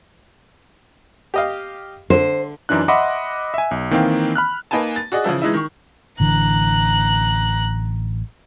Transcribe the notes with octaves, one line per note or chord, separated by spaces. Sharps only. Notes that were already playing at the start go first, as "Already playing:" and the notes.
G4 D#5 F5
D3 C5
F#2 E3 D4 D#4 F#6
D#5 E5 F#5 B5 C6 D6
E5 G#5
B1
D#3 E3 A#3 C4 F5 G5
B5 F6 F#6
A#3 D#4 B4 G#5 A5
A6
F#4 G#4 D5 D#5
C#3 E3 F3 E4
E3 G#3 D#4 E4
D#3 C#6
A1 D3 E3 A#5 F#6